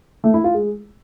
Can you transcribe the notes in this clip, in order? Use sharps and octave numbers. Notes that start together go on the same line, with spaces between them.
A3
E4
F4
G#3